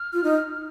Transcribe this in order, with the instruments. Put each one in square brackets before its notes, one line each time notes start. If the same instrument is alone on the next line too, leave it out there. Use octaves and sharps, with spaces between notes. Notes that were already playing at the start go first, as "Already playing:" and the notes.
Already playing: [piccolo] F6
[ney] F4
D#4